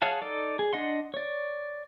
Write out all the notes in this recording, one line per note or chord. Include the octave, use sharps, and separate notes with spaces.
G#4 C#5 F5 F#5 A5
D#4 A4 D5
G#4
D4 D#5 F#5 C6
C#5 D5